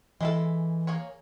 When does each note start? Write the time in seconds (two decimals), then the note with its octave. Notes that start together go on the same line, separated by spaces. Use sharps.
0.21 E3 G#3 E4 A4
0.87 A#3 G#4 C#5